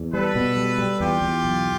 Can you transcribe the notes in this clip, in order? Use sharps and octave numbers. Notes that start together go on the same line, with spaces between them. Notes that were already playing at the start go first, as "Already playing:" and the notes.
Already playing: E2
G3 A4 B4
B2
G3
G3
E2 F4 G4
E2
B1